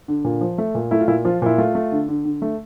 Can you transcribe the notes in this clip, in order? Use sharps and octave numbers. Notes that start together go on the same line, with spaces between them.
D3
A#2
F3
A3
A#2
A3 E4
F4
A#2 E4
F3 F4
A#2 E4
A3 F4
A3
D3
D3
D3
A3